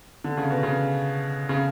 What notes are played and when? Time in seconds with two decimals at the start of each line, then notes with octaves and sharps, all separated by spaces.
0.24 D3
0.37 C#3
0.50 B2
0.63 C#3
1.49 C#3